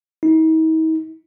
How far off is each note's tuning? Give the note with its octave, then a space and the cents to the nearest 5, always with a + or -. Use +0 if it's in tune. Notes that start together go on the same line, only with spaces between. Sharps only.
D#4 +45